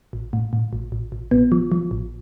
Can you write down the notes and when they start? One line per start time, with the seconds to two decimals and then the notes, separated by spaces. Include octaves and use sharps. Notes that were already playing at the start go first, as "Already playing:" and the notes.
0.13 A1
0.33 A2
0.53 A2
0.73 A1
0.92 A1
1.12 A1
1.31 A1 B3
1.52 F3
1.72 F3
1.91 A1